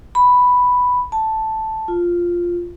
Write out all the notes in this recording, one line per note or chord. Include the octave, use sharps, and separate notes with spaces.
B5
A5
F4